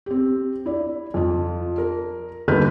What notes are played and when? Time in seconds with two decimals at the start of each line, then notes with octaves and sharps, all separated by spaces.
0.06 C4 G4
0.66 E4 D5
1.14 F2 F3 F4
1.78 A#4
2.48 G1 D#2 D#3 B4 F6 G6